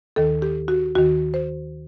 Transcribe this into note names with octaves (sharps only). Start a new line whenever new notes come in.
D#2 D#3 A4
G4
F#4
D#2 D#3 F#4
C5